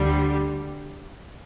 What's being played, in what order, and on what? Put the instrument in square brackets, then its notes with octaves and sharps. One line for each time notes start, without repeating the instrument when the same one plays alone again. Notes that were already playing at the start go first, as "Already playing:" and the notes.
Already playing: [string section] D2 D3 G3